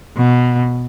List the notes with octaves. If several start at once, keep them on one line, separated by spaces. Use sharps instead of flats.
B2